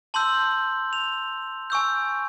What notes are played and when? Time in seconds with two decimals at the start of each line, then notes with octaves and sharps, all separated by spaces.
0.14 A5 C6 E6 G6 F#7
0.93 F7
1.70 G#5 C#6 E6 G6